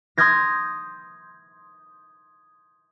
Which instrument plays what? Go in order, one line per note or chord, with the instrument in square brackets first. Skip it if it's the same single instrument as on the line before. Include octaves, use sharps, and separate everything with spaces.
[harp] C6 D#6 F6 G6 G#6 A#6